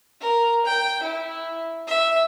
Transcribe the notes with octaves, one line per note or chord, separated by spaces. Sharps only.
A#4
G5
E4
E5